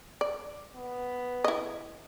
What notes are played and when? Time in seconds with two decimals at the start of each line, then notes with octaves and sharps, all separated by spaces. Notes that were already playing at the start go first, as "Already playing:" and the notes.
0.21 D5
0.76 B3
1.44 E4 D#5